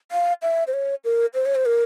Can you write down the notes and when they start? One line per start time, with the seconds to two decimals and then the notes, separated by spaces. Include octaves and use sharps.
0.12 F5
0.42 E5
0.67 C5
0.73 C#5
1.05 A#4
1.34 C5
1.46 C#5
1.55 C5
1.66 A#4